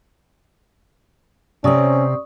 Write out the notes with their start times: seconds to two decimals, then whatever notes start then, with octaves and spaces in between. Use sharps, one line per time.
1.64 C3 C4 C#4 D5 C#6 D#6